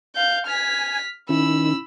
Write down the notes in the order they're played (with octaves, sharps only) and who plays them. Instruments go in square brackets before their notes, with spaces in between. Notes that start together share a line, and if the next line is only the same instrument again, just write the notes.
[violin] F5 G6
[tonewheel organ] G#5 [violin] F6 B6
[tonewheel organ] D#3 [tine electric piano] C#4 E4 [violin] B5 E6